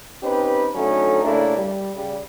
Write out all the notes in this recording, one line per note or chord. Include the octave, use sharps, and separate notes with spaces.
C4 C#4 D#4 G4 B4
D3 F#3 A3 C#4 D#4
C#3 A3 A#3 D4 E4
G3
C#3 G3